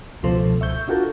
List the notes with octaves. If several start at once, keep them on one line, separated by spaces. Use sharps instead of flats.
C#2 B2 F3 A4 C5
E5 C#6 G6
D4 F4 F#4 A4 A#4